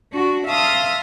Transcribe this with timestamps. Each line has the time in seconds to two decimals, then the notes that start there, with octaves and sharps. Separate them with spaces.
0.12 D4 F#4
0.46 E5 F5 A5 C6 D#6 F6